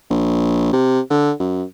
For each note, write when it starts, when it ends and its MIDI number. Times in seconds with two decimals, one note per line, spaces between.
0.10 0.72 34
0.73 1.00 48
1.10 1.32 50
1.40 1.64 42